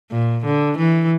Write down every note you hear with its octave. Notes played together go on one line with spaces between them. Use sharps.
A#2
D3
E3